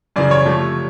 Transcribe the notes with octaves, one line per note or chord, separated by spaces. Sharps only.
F#2 C#3 E3 D5
C#5
C3 F3 A3